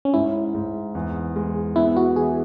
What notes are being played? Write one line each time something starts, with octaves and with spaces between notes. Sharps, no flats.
C#4
G#2 E4
G#2
E2
G#3
B3 E4
F#4
E3 G#4